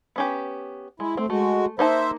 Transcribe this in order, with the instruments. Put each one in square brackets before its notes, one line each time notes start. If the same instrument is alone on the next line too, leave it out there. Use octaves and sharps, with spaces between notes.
[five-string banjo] B3 C#4 G4
[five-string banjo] G#3 [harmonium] E4
[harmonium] A3 [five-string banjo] C4
[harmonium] G#3 F#4 [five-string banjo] A3
[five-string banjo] A#3 D#4 A5 [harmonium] C5 E5